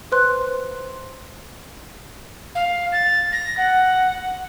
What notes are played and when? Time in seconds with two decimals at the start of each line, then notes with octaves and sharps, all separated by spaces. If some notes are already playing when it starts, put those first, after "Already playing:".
0.12 B4 C5 C6 F#6
2.55 F5
2.92 A6
3.32 A#6
3.57 F#5